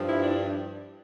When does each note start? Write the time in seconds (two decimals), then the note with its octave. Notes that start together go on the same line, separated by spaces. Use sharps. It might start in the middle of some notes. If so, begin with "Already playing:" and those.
Already playing: G2 F3
0.08 E4
0.23 D4